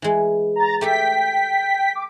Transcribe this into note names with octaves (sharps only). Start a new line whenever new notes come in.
E3 G#3
A#5 A6
A3 G4 A4 G5 B6
D6